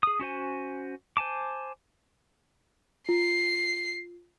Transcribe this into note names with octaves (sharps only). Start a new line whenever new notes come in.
G#4 D#6
C#4 F#4 C5 G#5
C5 G#5 A5 D6
F4 C7